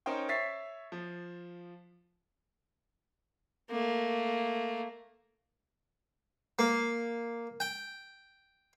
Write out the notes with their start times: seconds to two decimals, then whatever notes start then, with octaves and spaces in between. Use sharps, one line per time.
0.06 C#4 D#4 A#4 C5 G5
0.29 C#5 E5 A6 B6 C7
0.92 F3
3.70 A3 A#3
6.59 A#3
7.60 G5